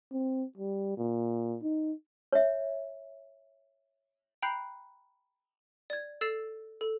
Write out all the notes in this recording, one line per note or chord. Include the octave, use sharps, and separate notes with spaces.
C4
G3
A#2
D#4
C#5 E5
G5 A#5 B5 F#6 G6 C7
D5 G#6
A4 E6 A6 C7 E7
A4